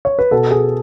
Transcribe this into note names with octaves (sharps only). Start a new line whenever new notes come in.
C#5
B4
B2 A4
G#4